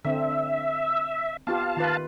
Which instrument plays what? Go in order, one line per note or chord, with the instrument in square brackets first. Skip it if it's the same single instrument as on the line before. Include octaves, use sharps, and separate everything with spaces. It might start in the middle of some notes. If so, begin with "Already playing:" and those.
[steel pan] D3 C4 [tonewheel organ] E5
[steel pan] B3 F4 G4 [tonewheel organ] F5 A5
[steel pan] D#3 F4 B4